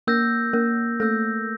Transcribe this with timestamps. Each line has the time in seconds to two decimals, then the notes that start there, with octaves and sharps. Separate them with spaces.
0.07 A#3 A#4 E6 G6 A#6
0.53 A#3 A#4
1.00 A3 A4 E6 G6 A#6